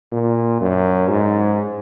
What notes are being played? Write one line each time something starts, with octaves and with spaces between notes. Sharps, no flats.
A#2
F#2
G#2